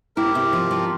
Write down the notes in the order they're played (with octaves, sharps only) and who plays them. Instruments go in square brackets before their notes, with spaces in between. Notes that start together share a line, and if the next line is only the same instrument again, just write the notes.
[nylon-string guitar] E4 [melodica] G4 A#4
[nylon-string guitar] C3
F3
F3